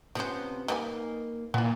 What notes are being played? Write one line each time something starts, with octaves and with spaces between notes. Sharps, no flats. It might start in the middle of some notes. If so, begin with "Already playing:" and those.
C3 F3 B3 C#4 C5
G3 A#3 D#4 A4 B4 G#5
A#2 B3 E4